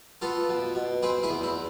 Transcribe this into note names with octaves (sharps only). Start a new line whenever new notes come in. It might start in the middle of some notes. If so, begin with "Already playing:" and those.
B3 F4 A4
B2
B2
C4 G#4 B4
E4 G#4
E2
E4